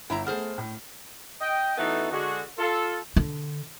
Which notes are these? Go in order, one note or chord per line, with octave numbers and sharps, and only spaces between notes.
G1 E4 E5 A#5
A3 B3 G#4 C5 F6
A2
D#5 G5
E3 A3 B3 D#4 F#4 A4
D3 G#3 F#4
F4 A4
D3